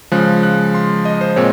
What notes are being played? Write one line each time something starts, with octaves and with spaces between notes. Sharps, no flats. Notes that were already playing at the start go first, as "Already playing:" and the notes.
C#3 F3 G#3 F#6
F#6
C6
D#5
C5
A#2 G#3 C4 C#5